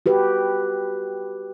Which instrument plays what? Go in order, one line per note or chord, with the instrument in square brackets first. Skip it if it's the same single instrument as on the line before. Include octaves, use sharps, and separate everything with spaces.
[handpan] F#4 G4 B4